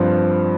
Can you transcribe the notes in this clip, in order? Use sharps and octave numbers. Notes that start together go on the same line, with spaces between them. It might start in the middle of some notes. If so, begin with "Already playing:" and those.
Already playing: G2 F3 C4